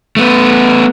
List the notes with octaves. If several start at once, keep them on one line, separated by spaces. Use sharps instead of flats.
A3 B3